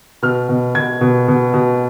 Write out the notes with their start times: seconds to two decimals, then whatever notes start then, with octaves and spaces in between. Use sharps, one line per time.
0.22 B2 F6
0.49 B2
0.75 B2 G#6
1.01 B2
1.28 B2
1.54 B2